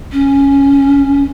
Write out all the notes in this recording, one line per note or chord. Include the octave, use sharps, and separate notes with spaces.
C#4